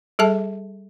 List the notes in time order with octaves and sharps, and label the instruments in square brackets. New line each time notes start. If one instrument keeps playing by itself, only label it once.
[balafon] G3 G#4 A4 E5 A5